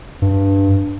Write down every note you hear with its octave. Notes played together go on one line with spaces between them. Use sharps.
G2